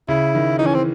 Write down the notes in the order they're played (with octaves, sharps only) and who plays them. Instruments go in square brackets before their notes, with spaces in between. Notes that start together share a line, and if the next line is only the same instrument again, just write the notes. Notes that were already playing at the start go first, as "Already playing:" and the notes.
[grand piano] C#3 [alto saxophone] E4
[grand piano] D#3
[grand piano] E3 [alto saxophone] D#4
[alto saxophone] C#4
C4